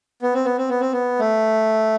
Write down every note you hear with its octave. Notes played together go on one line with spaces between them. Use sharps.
B3
C4
B3
C4
B3
C4
B3
A3